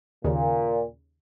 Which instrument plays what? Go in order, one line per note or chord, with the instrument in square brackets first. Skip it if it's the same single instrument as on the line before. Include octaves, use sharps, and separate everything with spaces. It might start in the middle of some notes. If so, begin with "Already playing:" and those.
[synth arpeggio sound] D#2 C#3 [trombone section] A#2